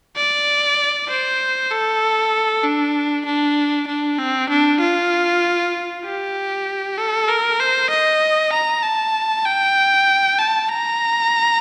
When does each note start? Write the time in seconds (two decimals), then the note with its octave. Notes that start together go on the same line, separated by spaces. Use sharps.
0.16 D5
1.09 C5
1.71 A4
2.63 D4
3.26 D4
3.88 D4
4.19 C4
4.50 D4
4.81 F4
6.05 G4
6.98 A4
7.28 A#4
7.60 C5
7.91 D#5
8.53 A#5
8.83 A5
9.46 G5
10.39 A5
10.69 A#5